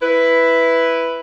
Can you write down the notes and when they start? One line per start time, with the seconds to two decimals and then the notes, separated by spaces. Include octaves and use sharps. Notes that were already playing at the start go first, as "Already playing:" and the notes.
0.02 E4 B4